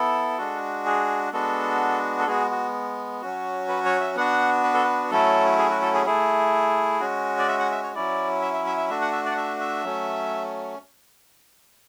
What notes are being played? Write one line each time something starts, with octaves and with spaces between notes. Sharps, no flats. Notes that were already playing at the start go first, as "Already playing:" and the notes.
Already playing: B3 E4 A4
G#3 D4 F#4
G#4
G#3 B3 D4 F#4 A4
A4
G#3 B3 F#4 G#4
F#4
F#3 C#4 F#4
B4
C#5
E5
B3 D4 F#4 F#5
B4
A4
B4
F#3 A3 C#4 E4 A4
G#4
F#4
A4
G#4
A3 E4 G#4
G#3 C#4 F#4
D5
E5
F#5
E5
C#5
F#3 C#4 E4 D5
E5
E5
E5
E5
A3 D4 F#4 E5
F#5
E5
D5
F#5
E5
E5
F#3 A3 C#4